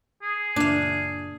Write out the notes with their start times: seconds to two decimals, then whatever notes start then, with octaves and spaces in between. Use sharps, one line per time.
0.23 G#4
0.56 F#1 A#2 D4 F5